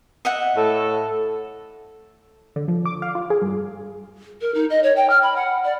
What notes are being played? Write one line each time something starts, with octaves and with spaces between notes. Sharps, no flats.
D#5 E5 F#5
A2 A4
D3
F3
D6
F5
F4
G#4
G2
A#4
D#4
D#5
C#5
G5
F6
B5
F#5
D5